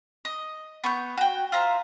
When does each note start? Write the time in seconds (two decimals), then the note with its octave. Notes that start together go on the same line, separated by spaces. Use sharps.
0.25 D#5
0.84 B3 C#6 G6
1.17 F#4 G5
1.52 F4 C5 E5 A#5